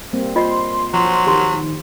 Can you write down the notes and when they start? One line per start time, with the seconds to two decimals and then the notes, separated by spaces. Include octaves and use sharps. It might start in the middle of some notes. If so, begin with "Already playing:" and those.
0.13 G3 A#3 C4
0.36 F4 C5 D#5 C6
0.93 F3 F#3 C6
1.27 D#3 G4 C6